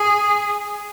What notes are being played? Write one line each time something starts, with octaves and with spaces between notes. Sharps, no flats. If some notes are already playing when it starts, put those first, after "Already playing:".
Already playing: G#4